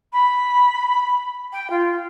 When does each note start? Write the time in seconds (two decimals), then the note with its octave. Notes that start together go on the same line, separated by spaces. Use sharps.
0.13 B5
1.52 G5
1.70 F4